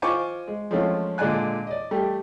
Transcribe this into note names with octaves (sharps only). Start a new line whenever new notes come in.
F4 C5 D#5 G#5 C#6 D6
G#3
F3 G#3 A3 C4 C#4 F4
A#2 D3 G#3 D5 G#5 F#6
D5 D#5
G3 A3 G4